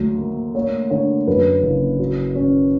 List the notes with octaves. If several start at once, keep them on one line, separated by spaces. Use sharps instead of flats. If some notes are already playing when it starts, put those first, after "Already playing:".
Already playing: D2 F#3
A#3
A#3 C#5
D3 C#5
F#2 B4
F#1
F#3
C#4